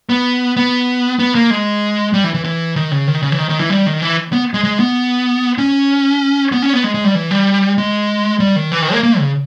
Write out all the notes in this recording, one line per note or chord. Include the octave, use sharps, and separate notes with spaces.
B3
B3
B3
A#3
G#3
G3
E3
E3
E3
D#3
C#3
D#3
C#3
E3
D#3
D#3
E3
G3
D#3
E3
B3
G#3
G#3
B3
C#4
B3
C#4
B3
G#3
G#3
G3
E3
G3
G#3
G3
D#3
E3
D#3
A#3
A#3
C#3